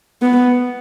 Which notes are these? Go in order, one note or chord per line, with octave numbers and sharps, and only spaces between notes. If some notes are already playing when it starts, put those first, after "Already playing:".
B3